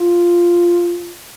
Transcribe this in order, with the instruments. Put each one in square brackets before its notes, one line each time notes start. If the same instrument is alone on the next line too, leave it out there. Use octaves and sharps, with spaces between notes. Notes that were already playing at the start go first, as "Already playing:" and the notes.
Already playing: [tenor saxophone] F4